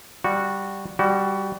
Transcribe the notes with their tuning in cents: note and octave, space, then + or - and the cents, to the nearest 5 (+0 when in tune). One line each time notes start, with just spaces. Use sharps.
G3 +0 F#4 -10
G3 +0 F#4 +20